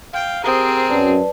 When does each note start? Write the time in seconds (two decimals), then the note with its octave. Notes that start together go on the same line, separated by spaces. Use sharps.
0.14 F5 G5
0.44 C4 G4 G#4 A#4 C5 D#6
0.89 F#2 B4 D5 A5